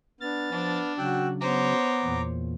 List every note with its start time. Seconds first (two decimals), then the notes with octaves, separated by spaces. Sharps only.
0.21 B3 D4 F6 A6
0.52 F3 D4
0.98 C#3 F#3 F#4 G5 E6 F#6
1.41 B3 C5 C#5 A#5 D6
2.04 E2 A#2